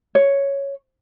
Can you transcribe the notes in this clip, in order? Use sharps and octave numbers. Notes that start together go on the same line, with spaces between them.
C#5